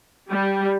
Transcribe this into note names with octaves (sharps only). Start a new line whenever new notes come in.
G3